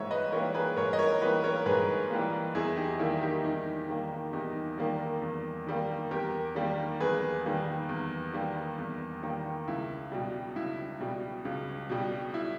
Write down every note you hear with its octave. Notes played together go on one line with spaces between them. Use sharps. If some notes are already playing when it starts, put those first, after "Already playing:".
Already playing: G#2 E3 G3 A#3 C#5 E5
B4 D#5
E3 G3 A#3 A#4 C#5
G#4 B4
G#2 A#4 C#5
D#5
A#4 C#5
E3 G3 A#3 B4 D#5
A#4 C#5
G#2 G#4 B4
E3 G3 A#3
E2 E4 G#4
D#4 G4
D#3 G3 A#3 E4
D#4 G4
E2 D#4
D#3 G3 A#3
E2 D#4 G4
D#3 G3 A#3
E2
D#3 G3 A#3
E2 G4 A#4
D#3 G3 A#3
E2 G#4 B4
D#3 G3 A#3
E2
D#3 G3 A#3
E2
D#3 G3 A#3
C#2 E4
B2 G3
C#2 E4
B2 G3
C#2
B2 G3
E4